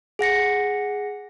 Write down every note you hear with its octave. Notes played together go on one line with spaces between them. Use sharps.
G#4 F#5 A#6 C#7